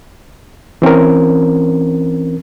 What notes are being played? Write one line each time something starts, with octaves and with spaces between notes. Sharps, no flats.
E3 C4 C#4 A#4